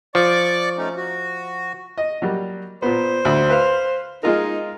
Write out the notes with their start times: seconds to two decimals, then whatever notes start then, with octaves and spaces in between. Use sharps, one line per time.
0.15 F3 D5 C#6 D6
0.77 A3 C#4 D#4
0.96 F#4
1.98 D#5
2.22 F#3 G3 A#3
2.82 A#2 B3 C5
3.25 D2 E5 B5
3.50 B4 F5
4.23 G#3 D#4 F4 A#4